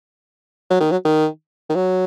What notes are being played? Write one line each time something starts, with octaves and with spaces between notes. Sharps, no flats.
F#3
D#3
F#3
D#3
D#3
F#3